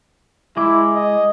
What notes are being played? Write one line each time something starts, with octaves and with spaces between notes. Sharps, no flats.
G#3 E4 D6
D#5